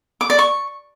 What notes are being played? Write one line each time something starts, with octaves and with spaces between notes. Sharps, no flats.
D6
D5
C#6